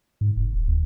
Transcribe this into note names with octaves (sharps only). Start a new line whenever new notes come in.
G#2
F1
D#1
D#2